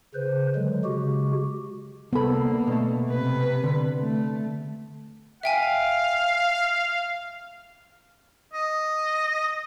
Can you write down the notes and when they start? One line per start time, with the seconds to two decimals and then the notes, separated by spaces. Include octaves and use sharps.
0.15 C#3 B4 C5
0.55 D3 F#3 G#3
0.84 C#3 G#3 F#4 G4
2.13 C2 D3 A#3 B3 A4 B5
2.67 B2 A3
3.10 C3 B4
3.64 D3
3.99 A3
5.43 E5 F5 G5 G#5
8.53 D#5